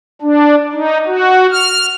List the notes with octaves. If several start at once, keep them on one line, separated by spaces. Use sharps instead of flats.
D4
D#4
F#4
F6